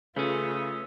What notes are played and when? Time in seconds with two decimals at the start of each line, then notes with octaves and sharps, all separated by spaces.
0.16 C#3 A3 C#4 F4 B4 D#6 E6